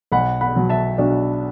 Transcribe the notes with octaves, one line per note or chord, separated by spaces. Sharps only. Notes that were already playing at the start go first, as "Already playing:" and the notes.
B1 F#5 B5
F#5 B5
B2 F#3
E5 A5
B1 D4 F#4